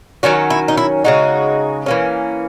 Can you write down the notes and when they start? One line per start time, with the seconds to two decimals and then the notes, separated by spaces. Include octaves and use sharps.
0.23 D#3 F#3 C#4 F#4
0.50 E4
0.68 D#4
0.77 E4
1.04 C#3 G#3 D#4 F#4
1.86 E3 A#3 C#4